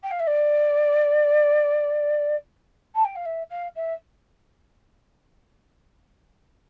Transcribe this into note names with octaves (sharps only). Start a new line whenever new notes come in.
G5
F5
E5
D5
A5
G5
F5
E5
F5
E5